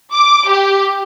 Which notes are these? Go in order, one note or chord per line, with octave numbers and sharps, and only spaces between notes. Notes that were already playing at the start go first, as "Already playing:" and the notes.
D6
G4